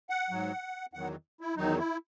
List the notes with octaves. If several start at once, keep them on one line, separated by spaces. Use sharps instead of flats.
F#5
G#2 F#3
E2 D#3 F#3 F#5
E4
E2 D#3 F#3 D#4
E4